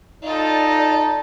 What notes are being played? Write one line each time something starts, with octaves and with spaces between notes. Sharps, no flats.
D#4 F4 A4 D5